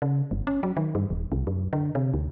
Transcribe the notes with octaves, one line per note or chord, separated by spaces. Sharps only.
C#3
G1
C#4
F#3
D#3
G2
D#1
C2
F#2
D3
C3
D2